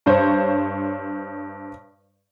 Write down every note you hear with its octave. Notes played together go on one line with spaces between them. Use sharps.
G2 C5 C#5